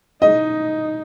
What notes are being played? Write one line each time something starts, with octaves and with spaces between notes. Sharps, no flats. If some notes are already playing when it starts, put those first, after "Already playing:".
D#4 D#5